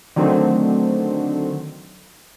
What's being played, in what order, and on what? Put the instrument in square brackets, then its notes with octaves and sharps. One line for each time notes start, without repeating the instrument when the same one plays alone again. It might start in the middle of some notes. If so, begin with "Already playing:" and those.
[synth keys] D3 D#3 F#3 A3 C4